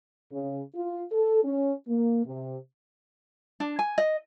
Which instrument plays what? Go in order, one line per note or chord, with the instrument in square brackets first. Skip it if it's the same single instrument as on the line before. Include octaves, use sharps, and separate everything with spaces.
[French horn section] C#3
F4
A4
C#4
A#3
C3
[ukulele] D4
G#5
D#5